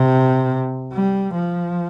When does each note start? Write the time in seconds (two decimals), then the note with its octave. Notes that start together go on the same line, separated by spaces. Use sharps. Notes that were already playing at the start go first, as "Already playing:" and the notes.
Already playing: C3
0.92 G3
1.34 F3